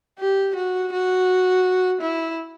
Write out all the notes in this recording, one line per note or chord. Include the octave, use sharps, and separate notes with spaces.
G4
F#4
F#4
E4